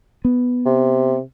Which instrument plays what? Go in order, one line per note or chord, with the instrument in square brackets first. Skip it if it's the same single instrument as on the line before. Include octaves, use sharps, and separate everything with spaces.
[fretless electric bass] B3
[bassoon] C3